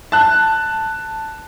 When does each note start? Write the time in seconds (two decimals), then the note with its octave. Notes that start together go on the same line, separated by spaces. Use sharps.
0.12 A5 F#6